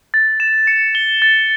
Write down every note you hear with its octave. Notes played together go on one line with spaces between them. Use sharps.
A6
E7
C#7
G7
A6